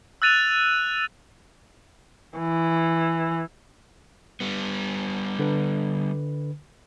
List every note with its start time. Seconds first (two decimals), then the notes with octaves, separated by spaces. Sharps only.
0.22 E6 F#6 A6 D#7 F7
2.39 E3
4.41 G3 B3
5.39 D3 B4